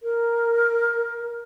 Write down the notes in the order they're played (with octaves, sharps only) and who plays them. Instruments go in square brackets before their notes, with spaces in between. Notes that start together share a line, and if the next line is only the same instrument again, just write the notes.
[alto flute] A#4